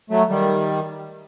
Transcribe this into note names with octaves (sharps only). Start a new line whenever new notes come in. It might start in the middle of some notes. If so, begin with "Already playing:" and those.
F#3 A3
D#3 G3